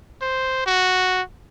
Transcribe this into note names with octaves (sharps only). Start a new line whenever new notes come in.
C5
F#4